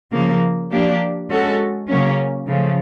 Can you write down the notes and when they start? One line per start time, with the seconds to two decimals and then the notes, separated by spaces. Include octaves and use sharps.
0.12 C#3 F3 A#3
0.71 F3 A#3 D4 G4
1.30 G#3 C#4 F#4 A4
1.88 C#3 F#3 A#3 C#4
2.47 C#3 F3 A3